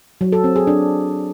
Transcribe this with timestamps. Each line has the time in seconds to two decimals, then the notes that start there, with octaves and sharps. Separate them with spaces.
0.21 F#3
0.32 A4
0.44 C4
0.56 G#4
0.67 D4